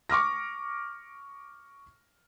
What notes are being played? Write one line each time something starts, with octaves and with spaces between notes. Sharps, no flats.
C#6 D6 F6 A#6